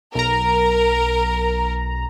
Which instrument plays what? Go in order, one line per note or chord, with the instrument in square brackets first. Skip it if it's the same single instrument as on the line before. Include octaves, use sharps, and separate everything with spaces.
[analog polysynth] B1 A#5 [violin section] A#4